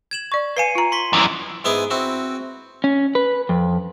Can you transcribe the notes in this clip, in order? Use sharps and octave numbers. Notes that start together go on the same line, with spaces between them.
G#6 E7 F#7
D5 C#6
B4 F5 G#5 C7 C#7 D#7
F4 A#5
C6 C#6 B6
F#2 E3
G#2 B3 E4 G#4 G#5 D6
C4 E4 F#4
C#4
B4
F2